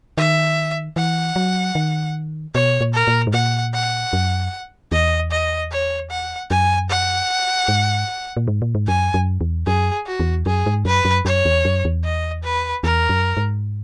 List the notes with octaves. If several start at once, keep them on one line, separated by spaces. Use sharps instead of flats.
D#3 E5
E3 F#5
F#3
D#3
B2 C#5
A#2
A#4
A#2
G#2
A#2 F#5
F#5
F#2
E2 D#5
D#5
C#5
F#5
F#2 G#5
F#5
G#2
A#2
G#2
A#2
G#2
F#2 G#5
F#2
E2
F#2 G#4
F#4
E2
F#2 G#4
G#2
F#2 B4
F#2
F#2 C#5
E2
F#2
E2
D#5
B4
E2 A#4
F#2
G#2